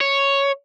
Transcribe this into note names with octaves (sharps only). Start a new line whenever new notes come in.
C#5